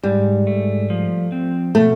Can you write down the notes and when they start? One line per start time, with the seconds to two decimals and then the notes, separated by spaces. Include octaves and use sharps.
0.03 G#2 G3
0.47 A3
0.90 F3
1.32 C4
1.75 B2 A3